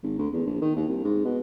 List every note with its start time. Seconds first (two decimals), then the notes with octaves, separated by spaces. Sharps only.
0.03 G#1
0.18 D2
0.33 E2
0.46 A#1
0.61 D#3
0.76 D#2
0.88 C2
1.04 G#2
1.25 B2